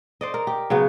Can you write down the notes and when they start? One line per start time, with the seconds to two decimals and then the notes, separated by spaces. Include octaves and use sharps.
0.21 C5 D5 D#5
0.34 A#4
0.47 G4
0.70 C#3 F#3 B3